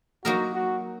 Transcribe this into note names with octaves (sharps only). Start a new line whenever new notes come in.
F#3 A#3 D#4 F#4 A#4
F#4